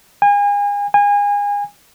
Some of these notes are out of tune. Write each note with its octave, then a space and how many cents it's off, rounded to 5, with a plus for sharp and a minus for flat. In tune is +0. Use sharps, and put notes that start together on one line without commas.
G#5 -35
G#5 -30